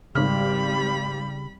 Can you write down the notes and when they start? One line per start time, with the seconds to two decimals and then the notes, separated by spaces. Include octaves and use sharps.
0.15 G#1 C#3 G3 B5 F6